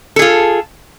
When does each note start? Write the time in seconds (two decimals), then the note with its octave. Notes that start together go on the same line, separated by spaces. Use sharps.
0.16 A4
0.19 G#4
0.22 F4